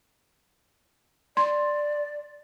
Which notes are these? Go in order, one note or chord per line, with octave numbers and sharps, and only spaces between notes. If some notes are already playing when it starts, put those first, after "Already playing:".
D5 C6